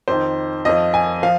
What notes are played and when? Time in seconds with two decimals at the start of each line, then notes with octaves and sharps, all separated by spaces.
0.08 F2 D#3 C5
0.65 F2 F3 D#5
0.94 G#5
1.23 F3 F5